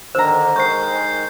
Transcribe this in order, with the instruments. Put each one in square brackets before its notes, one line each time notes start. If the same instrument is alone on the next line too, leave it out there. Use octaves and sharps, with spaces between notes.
[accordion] D3 D#3 [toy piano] C5 [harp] A#5 E6
[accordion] D#3 G#3 [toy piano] C5 C#6 [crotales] G6 C7